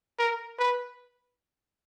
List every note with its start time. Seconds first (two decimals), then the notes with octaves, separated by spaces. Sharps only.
0.19 A#4
0.59 B4